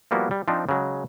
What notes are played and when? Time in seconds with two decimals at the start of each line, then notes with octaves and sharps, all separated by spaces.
0.11 F3 G3 A#3 B3 E4 F#4
0.31 G3
0.48 F3 C4 D4 D#4
0.69 C#3 F#3 G#3